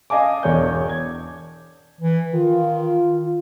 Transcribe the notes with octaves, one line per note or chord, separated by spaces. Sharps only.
D#5 F5 G#5 A5 D6
E1 E2 C#5 D5 G6
G#6
E3
D#3 F4